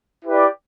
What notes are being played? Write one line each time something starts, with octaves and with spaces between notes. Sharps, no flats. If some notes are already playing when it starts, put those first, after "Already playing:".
E4 G4 B4 D5